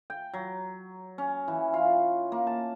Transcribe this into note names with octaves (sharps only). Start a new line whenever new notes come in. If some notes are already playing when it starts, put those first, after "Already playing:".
G5
F#3
C#4
E3
F4
A#3
A5